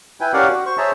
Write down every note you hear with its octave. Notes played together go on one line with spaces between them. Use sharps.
E4 B4 G5 G#5
C#4 G4 A#4 D5 F5 F#5
F#4
C5 C#6
G#4 C5 C#5 E5 A5 A#5